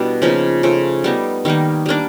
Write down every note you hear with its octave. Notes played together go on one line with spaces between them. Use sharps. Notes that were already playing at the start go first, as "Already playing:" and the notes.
Already playing: B2 G3 D4 E4
C#3 F3 A#3 D#4
C#3 F3 A3
G3 B3 D#4
D#3 G3 A#3 D#4
G3 A#3 D4